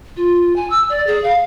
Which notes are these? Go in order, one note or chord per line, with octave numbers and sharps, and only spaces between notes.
F4
G#5
E6
D5
G#4
F5